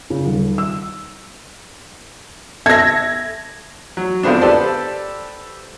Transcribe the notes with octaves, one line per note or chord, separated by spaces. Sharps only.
C#3
D#1
E6
A4 E5 G#6 A#6
F#3
F2 D3 B3 C4 D4
G4 A4 B4 C5 D5 A5